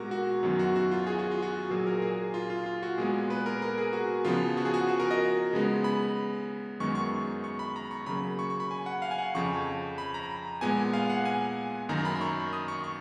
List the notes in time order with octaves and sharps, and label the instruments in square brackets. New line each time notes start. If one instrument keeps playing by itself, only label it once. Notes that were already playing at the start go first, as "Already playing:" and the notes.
Already playing: [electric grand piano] A#2 G#3 B3 F#4 A#4
F#4
F#2 D#3 F#3 B3
F#4
F#4
F4
G#4
F#4
F4
F#4
A#2 F#3 A#3 G#4
A#4
G#4
F4
F4
F4
F#4
A#2 G#3 B3 G#4
B4
A#4
A#4
G#4
F#4
C#3 F3 B3 F4
F#4
G#4
F#4
F#4
A#4
D#5
C#3 G#3 B3
B5
F#2 D#3 G#3 B3 C#6
C#6
C#6
B5
A#5
C#6
C#3 F#3 A#3 B5
C#6
C#6
B5
G#5
F#5
F5
G#5
F#5
F2 C#3 F3 C#6
B5
A#5
A#2 G#3 B3 G#5
F5
F#5
G#5
F#2 D#3 A#3 A#5
B5
B5
C#6
D#6
C#6
C#6